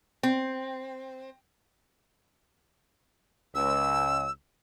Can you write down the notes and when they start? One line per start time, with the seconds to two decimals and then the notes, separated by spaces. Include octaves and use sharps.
0.23 C4
3.55 C#2 E6